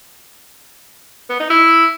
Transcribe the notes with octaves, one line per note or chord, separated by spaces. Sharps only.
B3
D#4
E4